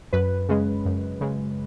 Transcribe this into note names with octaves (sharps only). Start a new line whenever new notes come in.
F#2 B4
C#3 G#3
F#2
C#3 G#3